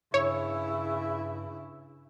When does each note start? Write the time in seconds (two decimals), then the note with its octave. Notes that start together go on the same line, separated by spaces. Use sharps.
0.14 G2 C#3 E4 C#5